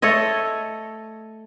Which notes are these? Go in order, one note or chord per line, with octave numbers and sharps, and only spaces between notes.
A3 A4 C#5 D#5